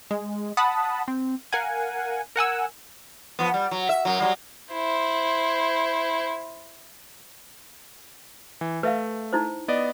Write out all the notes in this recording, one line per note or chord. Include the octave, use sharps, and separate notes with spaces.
G#3
F#5 A5 B5 D#6
C4
A#4 F5 F#5 G#5
A#4 F#5 G#5 E6
F3 B3
G3
F#3
E5
F#2 F#3
F#3 G3
E4 C5
E3
A3 B4 E5 F5
D#4 E4 C5
B3 D5 D#5